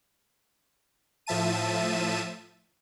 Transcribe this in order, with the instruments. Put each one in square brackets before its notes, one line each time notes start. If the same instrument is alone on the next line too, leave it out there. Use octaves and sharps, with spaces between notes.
[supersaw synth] A2 F3 E5 A5 D#7